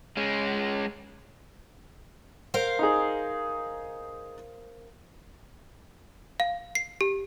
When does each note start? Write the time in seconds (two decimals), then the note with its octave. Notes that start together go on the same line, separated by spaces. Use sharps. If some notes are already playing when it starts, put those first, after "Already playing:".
0.17 G#3 C#4
2.54 A#4 C5 F5
2.79 D#4 G#4
6.40 F5
6.75 C7
7.01 G4